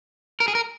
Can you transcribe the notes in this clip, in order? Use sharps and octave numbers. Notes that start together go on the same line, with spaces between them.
A#4
G#4
A#4